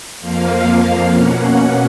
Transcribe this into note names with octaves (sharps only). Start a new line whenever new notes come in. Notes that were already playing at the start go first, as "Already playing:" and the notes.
F2 F3 A#3 F5
B2 A#3 C#4 F#5